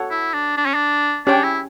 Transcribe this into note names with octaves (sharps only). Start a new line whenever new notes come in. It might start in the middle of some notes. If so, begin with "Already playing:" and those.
Already playing: F#4 A4 C#5 F#5
E4
D4
D4
C#4
D4
C#4 D4 G4 C#5 G5
E4